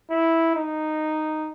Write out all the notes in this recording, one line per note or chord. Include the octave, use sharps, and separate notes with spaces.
E4
D#4